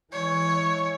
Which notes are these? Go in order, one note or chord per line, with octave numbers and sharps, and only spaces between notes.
E3 G#3 C#5